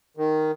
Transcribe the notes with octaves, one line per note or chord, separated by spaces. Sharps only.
D#3